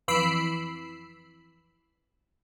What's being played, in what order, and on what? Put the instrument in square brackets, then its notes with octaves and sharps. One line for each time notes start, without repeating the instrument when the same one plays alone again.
[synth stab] F2 E3 B5 E6 C7 D7